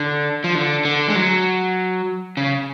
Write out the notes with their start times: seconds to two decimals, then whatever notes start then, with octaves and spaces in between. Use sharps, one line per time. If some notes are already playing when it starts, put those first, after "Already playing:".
Already playing: D3
0.44 F3
0.55 D3
0.85 D3
1.09 G#3
1.16 F#3
2.37 C#3